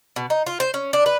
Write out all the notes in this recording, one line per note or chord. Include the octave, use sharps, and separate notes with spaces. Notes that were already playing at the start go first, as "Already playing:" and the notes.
B2
D#4
F4
C5
C#4
D4
B4